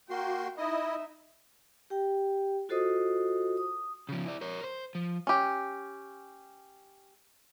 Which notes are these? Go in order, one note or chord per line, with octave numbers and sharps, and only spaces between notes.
A#3 F#4 G5 C6
D#4 E4 D#5 E5
G4 G5
F4 F#4 A4 C5 D#5 D#6
D#6
C#3 F3
E4 D5
A#4 C#5
C5
F3
C#4 G4